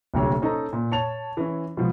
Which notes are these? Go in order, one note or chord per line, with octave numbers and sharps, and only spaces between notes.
D#1 D2 C3 F#3 C#5
C#4 D#4 A4 C5 D#5 A#5
A#2
C#5 A5 F7
E3 C#4
B2 F3 G#3